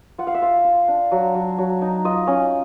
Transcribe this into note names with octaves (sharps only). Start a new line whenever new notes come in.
F4 F#5
F5
E5
F4 F5
F4
D4
F#3
F#3
F#3
D#4
F4 D#5
C#4